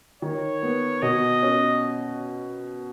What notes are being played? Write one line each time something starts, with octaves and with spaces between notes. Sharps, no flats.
D#3 C#5
B3
B2 D#5
C#4